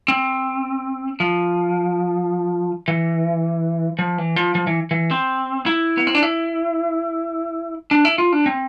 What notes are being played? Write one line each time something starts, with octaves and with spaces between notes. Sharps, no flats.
C4
F3
E3
F3
E3
F3
F3
E3
E3
C4
E4
B3
C4
D4
E4
D4
E4
F4
D4
C4